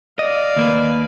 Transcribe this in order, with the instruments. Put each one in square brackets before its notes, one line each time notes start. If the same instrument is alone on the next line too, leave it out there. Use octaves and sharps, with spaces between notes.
[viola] D5 F5 [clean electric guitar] D#5
[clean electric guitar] D#2 A#3 B4